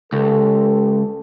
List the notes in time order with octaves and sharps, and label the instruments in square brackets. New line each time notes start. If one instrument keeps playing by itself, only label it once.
[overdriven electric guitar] C#2 [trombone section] G4 A4